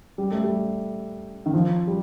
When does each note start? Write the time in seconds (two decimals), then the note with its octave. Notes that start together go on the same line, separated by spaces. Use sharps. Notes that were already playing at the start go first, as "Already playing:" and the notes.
0.18 G3
0.31 A3
0.44 G3
1.46 D#3
1.54 F3
1.87 G3